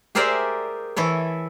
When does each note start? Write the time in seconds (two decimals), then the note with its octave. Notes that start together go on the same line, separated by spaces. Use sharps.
0.15 G4 G#4 A#4 C5 D5 E5
0.96 E3 E4 A4 C#5